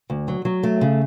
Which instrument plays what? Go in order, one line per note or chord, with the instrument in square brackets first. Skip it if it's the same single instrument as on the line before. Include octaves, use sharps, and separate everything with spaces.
[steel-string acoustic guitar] D2
F#3
F#3
A3
C#3